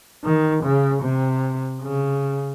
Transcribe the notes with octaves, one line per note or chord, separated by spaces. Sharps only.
D#3
C#3
C3
C#3